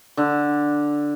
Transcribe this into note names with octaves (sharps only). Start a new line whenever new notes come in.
D3